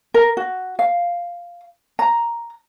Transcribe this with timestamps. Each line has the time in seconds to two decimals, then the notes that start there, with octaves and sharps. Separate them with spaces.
0.14 A#4
0.37 F#4
0.79 F5
1.99 A#5